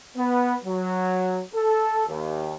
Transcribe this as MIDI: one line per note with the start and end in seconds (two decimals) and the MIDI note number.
0.16 0.54 59
0.65 1.40 54
1.54 2.02 69
2.07 2.54 39